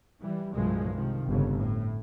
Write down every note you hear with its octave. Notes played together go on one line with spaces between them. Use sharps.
E3 G3
C2 G2 A#2 F3 F#3 G#3
C3 D#3 F3
G1 F2 C#3
A2